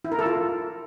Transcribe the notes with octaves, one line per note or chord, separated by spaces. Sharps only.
E4
A#4
A4
F4